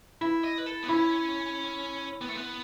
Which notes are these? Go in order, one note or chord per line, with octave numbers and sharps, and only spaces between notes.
E4 E5
D#5
B4
A4
B3
C#4 E4
B3
A3
B3